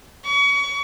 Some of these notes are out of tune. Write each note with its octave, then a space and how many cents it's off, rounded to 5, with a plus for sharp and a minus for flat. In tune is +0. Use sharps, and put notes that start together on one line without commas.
C#6 +30